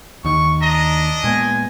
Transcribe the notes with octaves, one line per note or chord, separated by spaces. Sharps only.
D#2 D#3 C#6
D4 D#5 A#5
A#2 G#3 B3 G#5